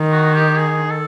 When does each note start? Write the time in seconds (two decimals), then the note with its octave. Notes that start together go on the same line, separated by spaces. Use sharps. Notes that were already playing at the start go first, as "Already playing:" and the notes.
Already playing: D#3
0.12 F#4
0.34 G4
0.57 G#4
0.91 A4